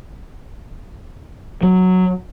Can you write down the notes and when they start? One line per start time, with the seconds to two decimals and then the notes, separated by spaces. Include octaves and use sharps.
1.63 F#3